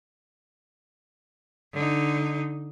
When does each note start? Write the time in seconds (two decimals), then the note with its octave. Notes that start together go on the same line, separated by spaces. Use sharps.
1.73 D3 D#4